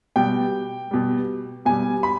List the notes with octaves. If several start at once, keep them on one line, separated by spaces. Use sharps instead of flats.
B2 G3 G5
B2 G3
B2 G3 G#5
B5